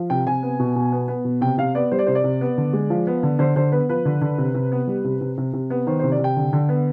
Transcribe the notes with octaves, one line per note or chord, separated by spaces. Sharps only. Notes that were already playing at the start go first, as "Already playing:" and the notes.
Already playing: F3
C3 G5
C3 G#5
B3
B2
B2
B3
B3
B2
C3 G5
C3 F5
B3 D5
G3 C5
D5
C3 C5
D5
C3
B3
D3
G#3
F3
B3
D3
D3 C5
D3 C5
B3 B4
F3 B4
D3
D3
C3
C3
B3
G3
C3
C3
C3
C3
B3
D#3 C5
C5
C3
D5
C3
G5
D3
D3
B3